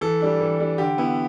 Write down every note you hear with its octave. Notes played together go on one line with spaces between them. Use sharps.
E3 A4
G3 D4
E3
G3 D4
D3 G4
B3 E4